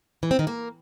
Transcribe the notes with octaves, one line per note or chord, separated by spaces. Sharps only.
E3
C4
D#3
A#3